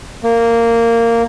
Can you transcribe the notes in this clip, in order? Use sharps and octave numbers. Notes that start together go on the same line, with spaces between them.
A#3